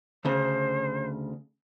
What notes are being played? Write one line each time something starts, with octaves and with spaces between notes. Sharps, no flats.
D2 C#3 C5